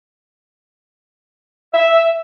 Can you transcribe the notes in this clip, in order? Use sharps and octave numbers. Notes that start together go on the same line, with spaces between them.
E5